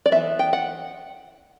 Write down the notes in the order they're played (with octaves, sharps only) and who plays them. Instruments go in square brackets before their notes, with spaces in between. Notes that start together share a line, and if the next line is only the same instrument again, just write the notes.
[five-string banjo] D5
E3 B3 D4 E5
G5
F#5